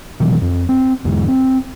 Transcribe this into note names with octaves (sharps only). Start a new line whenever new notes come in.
B2 D#3 E3 F#3
F2
C4
E2 G#2 D3 G#3
C4